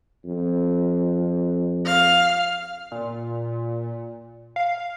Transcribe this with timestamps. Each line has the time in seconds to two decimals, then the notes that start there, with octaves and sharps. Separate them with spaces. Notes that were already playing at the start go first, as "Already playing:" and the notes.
0.24 F2
1.85 F5
2.92 A#2
4.56 F5